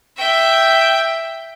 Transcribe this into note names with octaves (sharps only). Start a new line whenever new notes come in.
E5 G5